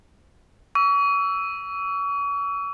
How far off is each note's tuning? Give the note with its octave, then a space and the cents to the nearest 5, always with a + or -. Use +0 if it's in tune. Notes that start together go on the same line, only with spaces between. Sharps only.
C#6 +40 E6 +0